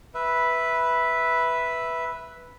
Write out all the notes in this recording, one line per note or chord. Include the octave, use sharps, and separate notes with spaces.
B4 E5